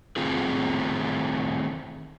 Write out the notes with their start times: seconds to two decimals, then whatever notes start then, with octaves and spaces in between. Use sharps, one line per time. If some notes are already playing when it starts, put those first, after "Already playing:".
0.16 D#3 G3 A3 C4 F4 G#4